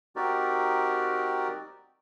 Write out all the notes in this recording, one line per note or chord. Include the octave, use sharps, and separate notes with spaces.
C4 D#4 F#4 G4 A#4 D5